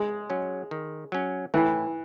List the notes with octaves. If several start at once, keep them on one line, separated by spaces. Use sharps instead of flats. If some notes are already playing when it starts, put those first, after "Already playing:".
Already playing: G#3
F#3 C#4
D#3
F#3 C#4
A2 E3